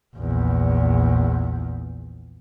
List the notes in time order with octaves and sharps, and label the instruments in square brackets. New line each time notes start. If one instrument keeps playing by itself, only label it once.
[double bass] A#1 E2